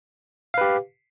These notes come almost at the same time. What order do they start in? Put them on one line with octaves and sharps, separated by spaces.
F5 B4 G4